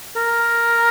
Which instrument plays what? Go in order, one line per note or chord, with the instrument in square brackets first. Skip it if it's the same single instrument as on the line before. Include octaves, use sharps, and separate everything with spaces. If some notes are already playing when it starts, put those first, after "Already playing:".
[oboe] A#4